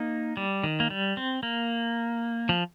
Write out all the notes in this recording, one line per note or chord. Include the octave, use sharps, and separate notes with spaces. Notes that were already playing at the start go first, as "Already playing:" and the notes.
Already playing: A#3 D#4
G3
D#3
A#3
G3
C4
A#3
F3